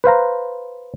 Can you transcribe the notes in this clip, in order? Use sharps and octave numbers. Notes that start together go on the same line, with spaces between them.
B4 C5 F5 A#5